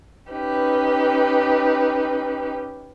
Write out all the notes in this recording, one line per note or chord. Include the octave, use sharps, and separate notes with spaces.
C#4 D#4 G4 B4